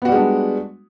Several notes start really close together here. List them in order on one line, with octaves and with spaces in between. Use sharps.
B3 F#4 G3 G#3 D4